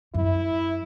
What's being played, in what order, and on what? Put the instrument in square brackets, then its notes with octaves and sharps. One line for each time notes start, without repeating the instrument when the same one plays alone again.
[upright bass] F#2 [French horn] E4